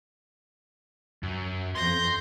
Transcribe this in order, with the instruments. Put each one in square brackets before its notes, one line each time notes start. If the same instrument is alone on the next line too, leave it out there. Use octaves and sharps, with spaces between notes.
[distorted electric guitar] F#2
[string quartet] F2 G6 A#6 [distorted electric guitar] C6